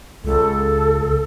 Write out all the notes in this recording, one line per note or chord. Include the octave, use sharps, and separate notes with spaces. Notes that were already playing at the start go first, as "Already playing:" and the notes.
C#2 A4